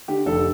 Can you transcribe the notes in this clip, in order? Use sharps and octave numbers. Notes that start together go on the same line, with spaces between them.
D3 G4
F1 A4